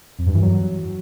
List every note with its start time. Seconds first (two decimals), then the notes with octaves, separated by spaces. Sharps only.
0.19 F2
0.26 G2
0.34 E3
0.42 F#3